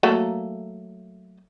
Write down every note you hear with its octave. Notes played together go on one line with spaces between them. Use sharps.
F#3 A3 A#3